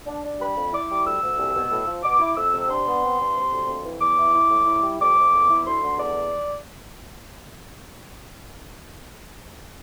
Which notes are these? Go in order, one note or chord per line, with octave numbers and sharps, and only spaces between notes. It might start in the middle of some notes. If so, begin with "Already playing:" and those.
D4
D4
G3 B5
F2
E4 D6
G3
D2 E6
D2
C2
B2
A2
F3
B2 D6
E4
F2 E6
C3
D4 C6
B3
C4
G2
C3
D2
F2
E3
E2 D6
E4
E4
A2
E4
G3
F2 D6
F2
E2
E4
D2 C6
D3
E2 D5